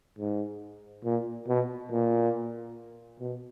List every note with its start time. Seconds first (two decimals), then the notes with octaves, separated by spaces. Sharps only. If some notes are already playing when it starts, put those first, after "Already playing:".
0.19 G#2
1.04 A#2
1.48 B2
1.91 A#2
3.20 B2